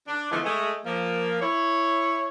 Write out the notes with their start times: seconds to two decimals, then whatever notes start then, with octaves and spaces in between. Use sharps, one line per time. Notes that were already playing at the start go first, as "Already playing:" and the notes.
0.08 D4
0.31 D3 E3 F3 G#3 A3 B3
0.45 G#3 A3
0.86 F3 A#3
1.42 E4 C#5